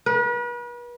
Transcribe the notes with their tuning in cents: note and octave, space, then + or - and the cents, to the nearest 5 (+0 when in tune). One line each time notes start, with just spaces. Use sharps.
B4 -40